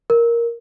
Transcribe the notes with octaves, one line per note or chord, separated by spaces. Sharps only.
A#4